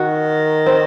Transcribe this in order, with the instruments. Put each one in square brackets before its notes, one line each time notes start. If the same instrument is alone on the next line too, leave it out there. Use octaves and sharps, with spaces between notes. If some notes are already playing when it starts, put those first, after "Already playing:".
Already playing: [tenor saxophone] D#3 [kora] F#4
[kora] C4